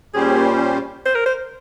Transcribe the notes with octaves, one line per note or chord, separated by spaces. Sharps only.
A#2 G3 C#4 G4 G#4 C5
C5
A#4
C5